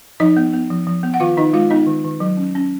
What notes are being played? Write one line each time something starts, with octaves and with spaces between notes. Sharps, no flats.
F3 D#4 D#5
B3
B3
F3
F3
B3
F#5
D#3 F4 F5
D#3 D#4 D#5
G#3 F4 F5
B3 D#4 D#5
D#3
D#3
F#3
C#4
C#4